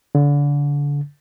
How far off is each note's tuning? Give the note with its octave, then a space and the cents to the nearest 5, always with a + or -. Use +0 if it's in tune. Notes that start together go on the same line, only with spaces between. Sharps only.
D3 -30